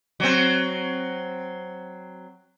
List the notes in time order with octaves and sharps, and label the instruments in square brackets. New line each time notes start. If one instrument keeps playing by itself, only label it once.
[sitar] F#3 C4